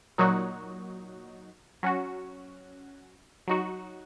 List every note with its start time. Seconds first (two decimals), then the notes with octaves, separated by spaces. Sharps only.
0.18 A#2 F#3 D#4 F#4
1.83 F#3 C#4 F#4
3.47 F#3 D#4 F#4